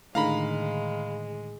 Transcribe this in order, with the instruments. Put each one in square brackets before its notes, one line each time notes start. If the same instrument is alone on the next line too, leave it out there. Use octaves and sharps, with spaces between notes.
[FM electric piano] A2 D3 D#3 [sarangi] G#3 [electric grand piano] F5 A#5 B5